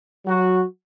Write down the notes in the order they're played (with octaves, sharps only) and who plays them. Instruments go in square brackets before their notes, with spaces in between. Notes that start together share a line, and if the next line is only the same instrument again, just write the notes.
[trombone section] F#3 F#4